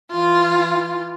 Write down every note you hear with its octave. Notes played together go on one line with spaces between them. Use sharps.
E3 F4